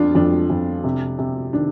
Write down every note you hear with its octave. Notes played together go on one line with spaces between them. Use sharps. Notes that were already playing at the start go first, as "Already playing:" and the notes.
Already playing: F2 F3 D4 F4
F2 D4
F2
C3
C3
D#3 D4